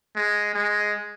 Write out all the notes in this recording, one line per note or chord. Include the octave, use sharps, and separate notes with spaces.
G#3
G#3